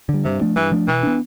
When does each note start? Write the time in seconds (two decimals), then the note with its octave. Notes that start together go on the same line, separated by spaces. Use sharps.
0.09 D3 G3
0.25 G2 C3
0.41 F3 A3 D4
0.56 G2 E3
0.72 F3 A3 D4
0.88 B2 E3
1.03 B3 D4